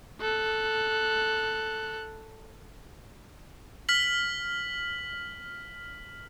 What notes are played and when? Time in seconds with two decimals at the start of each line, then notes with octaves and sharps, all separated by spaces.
0.21 A4 F#6
3.89 F6 B6 F#7